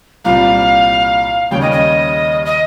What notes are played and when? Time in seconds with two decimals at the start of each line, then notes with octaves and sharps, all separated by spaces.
0.24 C2 A#2 G3 C4 F5
1.51 D#2 C#3 G3 C#4 G5
1.62 D#5
1.72 D#5
2.46 D#5